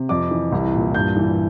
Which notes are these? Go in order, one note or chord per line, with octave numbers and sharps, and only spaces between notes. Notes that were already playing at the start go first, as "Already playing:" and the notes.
Already playing: C3
F2 D6
E3
C2
A#2
G2 G6
E3